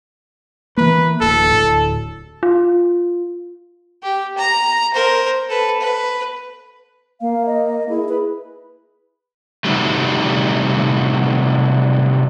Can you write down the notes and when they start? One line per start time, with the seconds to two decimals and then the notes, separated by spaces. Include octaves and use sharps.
0.77 E3 A#3 B4
1.21 D1 A4
1.53 D1
2.43 F4
4.03 G4
4.38 A#5
4.94 A#4 C5
5.49 A4 B4
5.81 B4
7.21 A#3 F5
7.46 D#5
7.89 E4 G#4
8.09 B4
9.65 C3 D#3 F#3 G3 A3